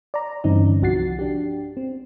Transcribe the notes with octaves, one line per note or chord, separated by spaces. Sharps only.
D5 A#5
G2 D3 E3 C4 C#4 D#4
C2 F3 F#4 F#5 A6 C7
D4 G4
C4